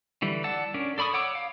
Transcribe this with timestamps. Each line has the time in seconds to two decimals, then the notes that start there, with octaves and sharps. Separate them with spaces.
0.22 D3 E3 G3
0.44 D5 F#5 A5 E6
0.74 C#4 D4 A#4
0.98 A4 D5 B5 C#6 D#6
1.13 C#5 F#5 D6 E6
1.35 F5